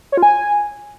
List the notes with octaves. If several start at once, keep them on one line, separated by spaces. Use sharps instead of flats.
C#5
F4
G#5